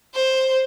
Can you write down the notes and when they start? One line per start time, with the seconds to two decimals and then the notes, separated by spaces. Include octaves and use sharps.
0.14 C5